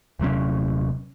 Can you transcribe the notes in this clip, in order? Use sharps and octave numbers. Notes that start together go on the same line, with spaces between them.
D#1 C3 F#3 C#4